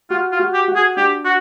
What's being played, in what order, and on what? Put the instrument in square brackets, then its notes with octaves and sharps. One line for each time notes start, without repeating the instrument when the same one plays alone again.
[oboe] F4 [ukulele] F#4
[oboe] F4
[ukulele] F#4
[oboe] G4
[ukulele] F#4
[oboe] G#4
[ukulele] D4 [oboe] G4
[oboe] F#4